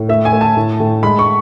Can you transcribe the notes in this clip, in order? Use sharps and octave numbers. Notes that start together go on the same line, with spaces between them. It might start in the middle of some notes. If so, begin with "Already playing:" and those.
Already playing: A2
A3 E5
G#5
A3
A5
A2
A2
G#3 B5
C#6